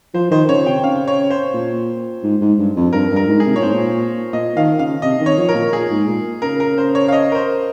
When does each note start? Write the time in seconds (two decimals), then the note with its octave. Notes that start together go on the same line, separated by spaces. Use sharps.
0.14 F3 C5
0.31 D#3 C5
0.48 C#3 C#5
0.66 C3 G5
0.84 C#3 F5
1.08 C#5
1.30 C5
1.54 A#2
2.23 G#2
2.41 G#2
2.59 G2
2.76 F2
2.93 G2 A#4
3.11 G2
3.16 A#4
3.28 G#2
3.40 G#4
3.46 C3
3.55 A#2 C#5
3.62 G#2 C5
3.73 A#2
4.33 A#2 D#5
4.56 D#3 F5
4.79 C#3 F5
5.02 C3 D#5
5.21 D#3
5.26 C#5
5.37 F3
5.49 A#4
5.55 A#2
5.73 A#2 G#4
5.90 G#2
6.07 A#2
6.42 C#3 A#4
6.60 A#4
6.78 C5
6.95 C#5
7.08 F5
7.12 D#5
7.32 A#4
7.35 C5